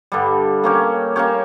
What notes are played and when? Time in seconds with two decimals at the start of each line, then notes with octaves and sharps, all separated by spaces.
0.12 G2 D3 G3
0.64 A#3 C#4 G4 C#5
1.16 A#3 C#4 G4 C#5